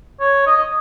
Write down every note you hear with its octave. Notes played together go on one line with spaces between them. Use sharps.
C#5
D#5